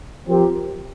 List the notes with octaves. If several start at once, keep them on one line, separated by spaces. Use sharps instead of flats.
F3 C4 G4 A#4